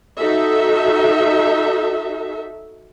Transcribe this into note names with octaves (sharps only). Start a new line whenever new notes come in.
D#4 F#4 A4 E5